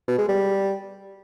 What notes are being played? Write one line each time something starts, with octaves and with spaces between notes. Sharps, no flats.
B2
G#3
G3